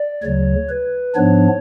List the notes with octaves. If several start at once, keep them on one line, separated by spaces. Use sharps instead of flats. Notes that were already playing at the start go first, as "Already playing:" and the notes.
Already playing: D5
D2 C#3 F#3 C#5
B4
G#2 F3 B3 D4 C#5